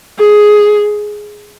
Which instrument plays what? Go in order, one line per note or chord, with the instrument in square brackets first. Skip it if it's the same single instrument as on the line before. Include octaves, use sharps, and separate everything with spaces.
[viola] G#4